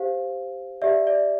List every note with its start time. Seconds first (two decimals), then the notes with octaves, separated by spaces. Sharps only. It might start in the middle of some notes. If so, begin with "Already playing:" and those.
Already playing: G4 C5 F5
0.82 G4 D5 E5
1.07 D5